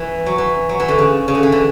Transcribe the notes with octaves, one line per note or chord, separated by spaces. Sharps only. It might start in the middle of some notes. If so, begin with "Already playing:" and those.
Already playing: E3
F#3
E3
F#3
E3
D3
C#3
C#3
D3
E3
D3